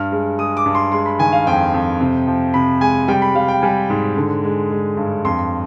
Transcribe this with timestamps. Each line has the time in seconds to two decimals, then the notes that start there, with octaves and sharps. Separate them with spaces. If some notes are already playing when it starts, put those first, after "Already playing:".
Already playing: G2 F6
0.12 G#3
0.39 G#3 D#6
0.57 D6
0.66 G2
0.75 C6
0.92 G#3 C6
1.06 B5
1.19 D#3 G#5
1.33 F5
1.47 F2 G5
1.74 F2
2.00 C3
2.27 F3
2.54 C3 B5
2.81 G#3 G#5
3.08 G3 G5
3.22 B5
3.35 G3 F5
3.48 G5
3.62 G3 G#5
3.89 G#2
4.17 D3
4.44 G#3
4.70 G#3
4.97 G2
5.25 F2 C6